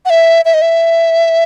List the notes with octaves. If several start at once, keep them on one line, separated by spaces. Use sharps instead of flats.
F#5
E5
E5
D#5
E5